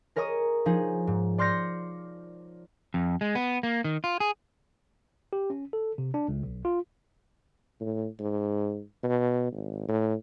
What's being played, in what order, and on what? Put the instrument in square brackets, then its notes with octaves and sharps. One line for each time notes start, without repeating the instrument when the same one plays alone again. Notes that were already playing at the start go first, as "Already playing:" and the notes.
[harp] G#4 A#4 C#5 D#5 A#5 D#6
F3 D#4 G#4
G#2
D5 C6 F6 G6 A#6 C#7
[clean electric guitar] F2
G#3
B3
A#3
D#3
F4
G#4
[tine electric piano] G4
C#4
A4
C3
D4
C#2
B1
F4
[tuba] A2
G#2
B2
G#1
A2